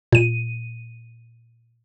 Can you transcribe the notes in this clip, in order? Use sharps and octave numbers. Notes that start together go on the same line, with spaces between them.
A#2 D#7